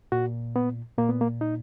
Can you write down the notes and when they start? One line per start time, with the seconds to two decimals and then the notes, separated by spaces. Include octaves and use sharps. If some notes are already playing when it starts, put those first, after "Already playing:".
0.12 A#2 F#4
0.56 B3
0.98 A#2 A#3
1.09 B3
1.21 A#3
1.41 D#4